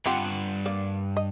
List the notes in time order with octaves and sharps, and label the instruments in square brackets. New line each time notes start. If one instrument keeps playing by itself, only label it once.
[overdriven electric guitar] G2 F#5 [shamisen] C4 F4 G4
[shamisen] A#3 D5
D#5